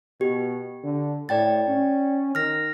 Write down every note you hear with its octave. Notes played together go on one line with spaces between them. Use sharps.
B2 G4
D3
A2 D5 G5 A6
C#4
D#3 F6 A#6